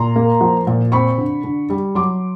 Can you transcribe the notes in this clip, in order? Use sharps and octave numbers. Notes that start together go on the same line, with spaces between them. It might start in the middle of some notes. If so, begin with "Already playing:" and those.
Already playing: A#2 A#5 C6
A#3
F3
A#2
C4 B5 C#6
D3
D3
G3
F#3 C6 D6